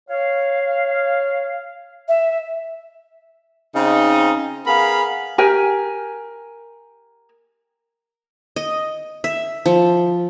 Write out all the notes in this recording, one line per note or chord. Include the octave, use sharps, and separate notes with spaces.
C#5 F5
E5
C#3 C4 D#4
B3 G#4 A#4 F5 B5
G4 A#4 G#5
D#5
E5
F3